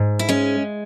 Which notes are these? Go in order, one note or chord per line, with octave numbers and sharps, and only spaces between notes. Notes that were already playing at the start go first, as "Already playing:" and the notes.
Already playing: G#2
E4
G#3 C#4